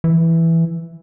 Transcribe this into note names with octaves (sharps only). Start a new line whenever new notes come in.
E3